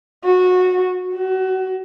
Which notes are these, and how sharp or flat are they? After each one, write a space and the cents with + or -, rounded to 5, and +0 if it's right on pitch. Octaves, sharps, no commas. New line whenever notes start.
F#4 -20
F#4 +30